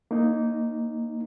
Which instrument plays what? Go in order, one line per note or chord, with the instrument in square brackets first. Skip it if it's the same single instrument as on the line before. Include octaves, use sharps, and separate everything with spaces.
[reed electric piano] A#3 D#4